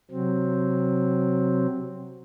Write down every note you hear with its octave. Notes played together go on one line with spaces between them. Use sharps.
C3 F#3 C4